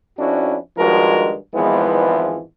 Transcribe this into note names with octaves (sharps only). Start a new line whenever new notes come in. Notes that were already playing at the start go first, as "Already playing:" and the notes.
F2 C#4 D4 E4 F#4
G2 D#3 F3 G#3 F#4 A#4
G#1 E2 E3 F3 G#3 B3